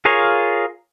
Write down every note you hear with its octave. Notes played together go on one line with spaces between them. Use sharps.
F4 G#4 A#4 C#5 F5